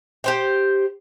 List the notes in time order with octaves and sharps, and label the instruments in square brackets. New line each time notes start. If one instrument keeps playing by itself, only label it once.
[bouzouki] G4 C5 G5